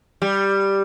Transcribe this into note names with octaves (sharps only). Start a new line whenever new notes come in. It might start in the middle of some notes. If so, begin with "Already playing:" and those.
G3